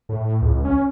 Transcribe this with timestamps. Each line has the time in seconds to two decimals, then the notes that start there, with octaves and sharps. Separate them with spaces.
0.09 A2
0.42 C#2
0.65 C#4